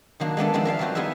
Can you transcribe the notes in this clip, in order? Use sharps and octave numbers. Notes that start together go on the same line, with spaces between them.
D#3 F#3 A#3 D4
G#3 B3 D4 A4
D#3 F3 G#3 C4 D4
A#4 E5 F5 A5
F#3 G3 C4 F4 F#4 C5
B3 D#4 E4 G#4 A#4 E5